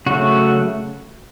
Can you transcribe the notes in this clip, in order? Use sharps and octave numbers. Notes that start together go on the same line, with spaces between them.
C#3 F#3 A3 F#4